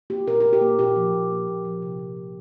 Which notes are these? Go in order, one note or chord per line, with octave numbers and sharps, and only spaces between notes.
A#3 G4
A#2 A#4
A#2 A#4
G4
A#3
A#2 G4
F3
A#2
A#3
A#2
F3
C3
F3
C3